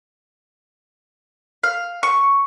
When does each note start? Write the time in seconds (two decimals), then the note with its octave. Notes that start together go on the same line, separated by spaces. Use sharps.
1.63 F5
2.03 C#6